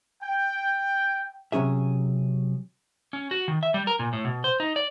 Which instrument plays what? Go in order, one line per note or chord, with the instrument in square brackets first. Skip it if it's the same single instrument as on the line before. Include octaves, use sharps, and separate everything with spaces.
[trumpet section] G5
[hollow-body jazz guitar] C3 F#3 C#4 G#4 E5
[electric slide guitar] C#4
F#4
D#3
E5
G3
A#4
A#2
A2
B2
C5
D#4
D5